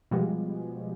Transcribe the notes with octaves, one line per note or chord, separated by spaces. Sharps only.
B2 F3 G3 G#3 B3